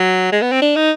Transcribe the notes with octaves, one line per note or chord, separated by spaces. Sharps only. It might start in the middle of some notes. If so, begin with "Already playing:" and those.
Already playing: F#3
G#3
B3
C4
D4
D#4